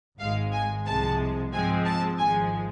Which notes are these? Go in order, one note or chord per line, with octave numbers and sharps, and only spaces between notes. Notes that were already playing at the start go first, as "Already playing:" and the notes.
G#1 G#2 G#3 F5
G#5
C2 C3 F3 G#3 A5
G#2 F3 G#3 C4 G#5
A5
G#1 G#2 F3 G#3 G#5